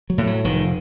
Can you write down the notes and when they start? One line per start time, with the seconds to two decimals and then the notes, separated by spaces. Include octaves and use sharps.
0.10 F#3
0.18 A2
0.27 F#3
0.45 F1 D#3